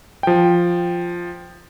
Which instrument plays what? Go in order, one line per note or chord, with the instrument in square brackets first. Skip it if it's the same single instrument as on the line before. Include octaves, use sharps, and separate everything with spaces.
[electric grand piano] F3 G5